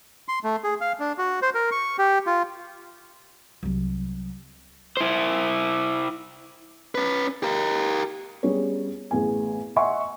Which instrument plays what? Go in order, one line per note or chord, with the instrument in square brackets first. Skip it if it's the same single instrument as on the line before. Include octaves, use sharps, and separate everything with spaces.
[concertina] C6
A3
G#4
F5
D4
F#4
C5
A#4
C#6
G4
F4
[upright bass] C2 F#3
[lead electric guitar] E4 C5
C#4 B4
G4 A#4
[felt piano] G3 B3 C#4 G#4 C#5
A1 B3 G#4 G#5
D#5 E5 F#5 G#5 C6 C#6